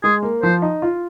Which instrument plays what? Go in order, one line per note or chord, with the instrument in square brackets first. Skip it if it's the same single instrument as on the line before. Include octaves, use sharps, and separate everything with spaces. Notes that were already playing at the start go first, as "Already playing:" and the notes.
[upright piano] G#3 [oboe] G#4
[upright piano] A#3
[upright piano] F3 [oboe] C5
[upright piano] D#4
F4